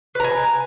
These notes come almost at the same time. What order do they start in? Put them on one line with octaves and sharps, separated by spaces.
B4 A#5 G#5